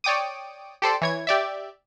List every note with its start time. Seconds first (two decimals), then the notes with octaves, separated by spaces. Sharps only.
0.04 C#5 D5 G5 D6 D#6
0.82 G4 A4 C5 D5
1.01 E3 C#5 G#6
1.27 G4 D5 E5